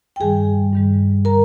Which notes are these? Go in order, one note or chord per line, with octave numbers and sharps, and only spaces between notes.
G5
G2 D#3 G3 G#4 G#5
G2 D#3 G3
D3 G3 A#4 A#5